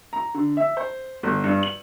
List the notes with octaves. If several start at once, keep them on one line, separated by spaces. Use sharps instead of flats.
A#5
D3
E5
C5
G1
G2
F#7